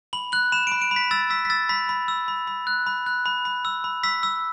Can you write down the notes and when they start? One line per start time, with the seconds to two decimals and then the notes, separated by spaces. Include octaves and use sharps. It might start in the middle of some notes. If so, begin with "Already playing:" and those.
0.13 B5 F#7
0.32 F#6 F#7
0.52 B5 E7
0.67 D7
0.72 B5
0.82 D7
0.91 B5
0.96 B6
1.11 E6 A6
1.30 E6 B6
1.45 B6
1.50 E6 A6
1.69 B5 B6
1.89 B5
2.08 E6
2.28 B5
2.47 B5
2.67 F#6
2.86 B5
3.06 F#6
3.26 B5
3.45 B5
3.65 E6
3.84 B5
4.03 E6 B6
4.23 E6